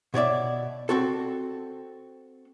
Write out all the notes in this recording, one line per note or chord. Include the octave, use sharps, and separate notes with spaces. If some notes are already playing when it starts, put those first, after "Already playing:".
B2 C#5 D5 E5
C4 F#4 A4